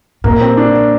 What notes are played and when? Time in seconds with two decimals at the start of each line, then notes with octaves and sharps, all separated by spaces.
0.24 A#2 A#3
0.41 C4
0.57 D4